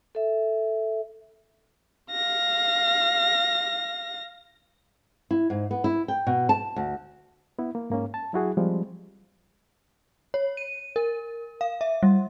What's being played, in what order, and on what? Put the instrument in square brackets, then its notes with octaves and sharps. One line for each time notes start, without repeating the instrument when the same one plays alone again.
[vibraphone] A4 E5
[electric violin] F5 A#6
[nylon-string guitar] E4
G#2
B3
E4
G5
B2
A5
D2
[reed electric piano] B3 E4
A#3
G#2 A#3 C#4
A5
F#3 E4 F#4 G#4
F3 G3 G#3 C4
[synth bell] C#5
D#7
A#4
F5
E5
G3